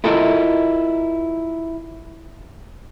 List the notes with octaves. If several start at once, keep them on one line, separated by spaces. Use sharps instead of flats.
E4 F4 A4 A#4 D#5 E5